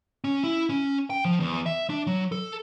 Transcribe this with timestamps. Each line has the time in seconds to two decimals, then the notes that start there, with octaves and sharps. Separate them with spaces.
0.24 C#4
0.44 E4
0.70 C#4
1.10 G5
1.25 F3
1.40 E2
1.66 E5
1.90 D4
2.07 F#3
2.32 A4